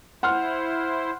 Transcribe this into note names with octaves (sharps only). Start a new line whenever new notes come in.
E4 C5 F#5 C6 F6